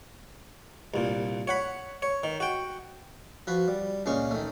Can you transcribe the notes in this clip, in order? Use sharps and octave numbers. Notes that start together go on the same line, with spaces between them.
C2 A#2
C#5 F#5 B5
C#5
D#3
F#4 G5
F3 F#4 B4
G3
C#2 A#2 G#3 C#4 C#6
D#3 A3